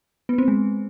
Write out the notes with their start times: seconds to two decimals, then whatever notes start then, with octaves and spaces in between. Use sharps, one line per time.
0.29 B3
0.38 C4
0.48 G#3